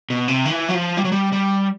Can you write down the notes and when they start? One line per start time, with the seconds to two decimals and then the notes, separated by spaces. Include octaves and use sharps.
0.10 B2
0.28 C3
0.45 D#3
0.51 E3
0.69 F#3
0.74 F3
0.97 G3
1.04 F#3
1.12 G3
1.32 G3